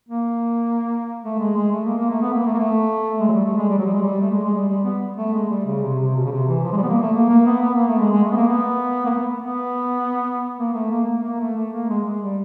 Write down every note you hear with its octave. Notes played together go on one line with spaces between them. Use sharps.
A#3
A3
G#3
G#3
A3
A#3
A#3
A3
B3
A#3
A3
A#3
A3
G#3
F#3
G3
A3
G#3
G3
F#3
G3
G#3
G3
A3
G#3
G#3
G3
G3
B3
A3
G#3
G3
C#3
C3
C3
B2
C#3
C3
E3
F3
G#3
G3
B3
A#3
A3
A#3
A#3
B3
B3
A#3
A3
G#3
G#3
A3
B3
A#3
B3
A#3
B3
B3
A#3
A3
A#3
A#3
A#3
A3
A3
A#3
G#3
G#3
G3